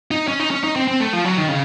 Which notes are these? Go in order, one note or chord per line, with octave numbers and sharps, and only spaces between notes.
D#4
C#4
D#4
C#4
D#4
C4
C4
A3
F3
F#3
D#3
C#3